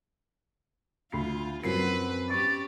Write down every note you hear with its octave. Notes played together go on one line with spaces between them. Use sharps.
D2 F4 B5 C7
F#2 F3 F#3 C4 B4 C7
C#4 G4 D5 C#6